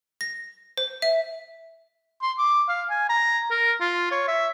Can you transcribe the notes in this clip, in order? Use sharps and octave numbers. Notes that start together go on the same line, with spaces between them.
A#6
C5
E5
C6
D6
F5
G#5
A#5
A#4
F4
C#5
E5